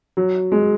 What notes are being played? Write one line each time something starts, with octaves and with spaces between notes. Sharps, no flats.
F#3
G#3